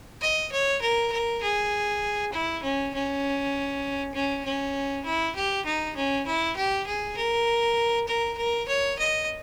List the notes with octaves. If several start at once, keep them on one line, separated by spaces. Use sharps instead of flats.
D#5
C#5
A#4
A#4
G#4
E4
C#4
C#4
C#4
C#4
E4
G4
D#4
C#4
E4
G4
G#4
A#4
A#4
A#4
C#5
D#5